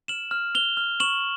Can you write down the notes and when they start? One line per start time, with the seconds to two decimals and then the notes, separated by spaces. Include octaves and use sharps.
0.08 F6 E7 F#7
0.31 F6
0.55 F6 F7 G7
0.77 F6
1.00 C#6 E7 F#7